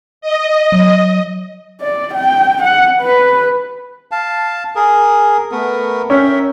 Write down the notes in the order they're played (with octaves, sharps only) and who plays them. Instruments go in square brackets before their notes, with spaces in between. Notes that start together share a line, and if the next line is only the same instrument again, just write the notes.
[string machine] D#5
[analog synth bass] F#3
[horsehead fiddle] D5
G5
F#5
B4
[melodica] F5 A5
G#4 A#4
A3 B3 A#4
[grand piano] C#4 [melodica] A#4 E5 G5